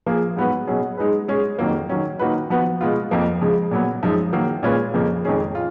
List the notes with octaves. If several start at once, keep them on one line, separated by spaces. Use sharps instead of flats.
F3 A#3 F4 G#4
G#2 F#3 B3 F#4 B4
B2 F#3 C#4 G#4
G#3 D#4 G#4 B4
G#3 C#4 G#4
F2 D#3 F#3 A#3 F4
D#3 F#3 C#4
D#3 A#3 D#4 F#4 B4
F3 B3 F#4 B4
B2 G#3 B3 F4
F2 F3 A#3
C#3 F3 G#3
A#2 F#3 B3
F#2 F3 G#3 D#4
D#3 F#3 A#3
A#2 G#3 C#4 F4 B4
F2 C#3 F3 A#3
F2 D#3 G#3 C#4 G#4
F4